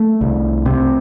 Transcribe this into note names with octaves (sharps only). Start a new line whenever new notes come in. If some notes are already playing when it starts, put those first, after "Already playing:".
Already playing: A3
C2
C3